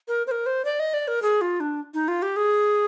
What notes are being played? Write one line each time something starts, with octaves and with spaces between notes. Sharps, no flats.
A#4
C5
A#4
C5
D5
D#5
D5
A#4
G#4
F4
D4
D#4
F4
G4
G#4